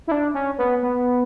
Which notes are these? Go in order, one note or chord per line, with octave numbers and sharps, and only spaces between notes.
E4
D4
C#4
B3
B3